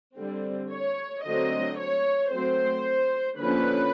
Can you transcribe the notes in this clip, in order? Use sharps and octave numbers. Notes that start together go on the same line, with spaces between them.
D3 G3 C4
C#5
D3 F#3 A3 C4 D#5
C#5
F#3 A3 C4 C5
D3 F3 A#3 C#4 B4